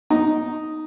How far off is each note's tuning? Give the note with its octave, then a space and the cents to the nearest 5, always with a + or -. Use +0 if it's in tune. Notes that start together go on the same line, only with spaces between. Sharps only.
D#4 +0